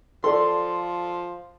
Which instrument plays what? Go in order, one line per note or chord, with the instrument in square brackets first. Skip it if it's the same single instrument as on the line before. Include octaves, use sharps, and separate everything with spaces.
[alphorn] F3 [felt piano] A4 D5 [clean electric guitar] C6